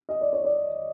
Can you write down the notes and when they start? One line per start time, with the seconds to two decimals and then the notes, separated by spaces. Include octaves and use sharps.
0.09 D#5
0.21 D5
0.33 C#5
0.44 D5